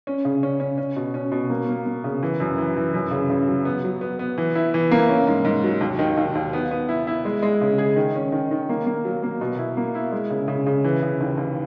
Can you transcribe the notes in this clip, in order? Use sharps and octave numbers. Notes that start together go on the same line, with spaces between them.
C#4
C#3
C#4
C#4
C#4
B2
C#4
B2
A#3
A#3
A#3
C#3
E3
F#2
E3
E3
F#2
C#3
C#3
F#3
B3
F#3
B3
B3
E3
E4
E3
A#3
C#4
G#2
G#2
F#3
D#2
D#3
D#2
D#2
B3
B3
E4
E4
G#3
G#3
C#3
G#4
D#3
C#4
D#3
D#3
A#3
A#3
F#3
A#3
B2
E4
A#3
E4
G#3
C#3
C#3
C#3
E3
C#3
D#2
D#2